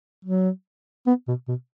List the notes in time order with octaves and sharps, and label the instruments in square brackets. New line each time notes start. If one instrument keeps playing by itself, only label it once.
[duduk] F#3
B3
B2
B2